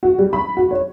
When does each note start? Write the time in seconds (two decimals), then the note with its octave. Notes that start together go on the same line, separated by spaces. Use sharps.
0.03 F#4
0.19 G3
0.33 B5
0.57 F#4
0.71 C#5